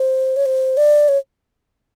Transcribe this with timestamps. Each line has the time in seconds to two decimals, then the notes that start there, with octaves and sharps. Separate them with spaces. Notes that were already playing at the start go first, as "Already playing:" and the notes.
Already playing: C5
0.36 C#5
0.46 C5
0.77 D5
1.08 C#5